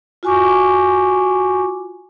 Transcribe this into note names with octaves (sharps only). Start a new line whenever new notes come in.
F4 F#4 G#5 C#6 D6